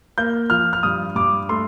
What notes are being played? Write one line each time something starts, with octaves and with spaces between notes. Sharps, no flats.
A#3 G6
F3 F6
F6
G2 D#6
G2 D6
A3 C6